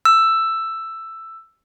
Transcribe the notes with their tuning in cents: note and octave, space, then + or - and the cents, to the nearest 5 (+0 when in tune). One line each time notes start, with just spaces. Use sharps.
E6 +10